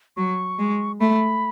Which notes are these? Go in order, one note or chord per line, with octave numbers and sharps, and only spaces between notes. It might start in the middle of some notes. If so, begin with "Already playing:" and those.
F#3 C#6
G#3
A3 B5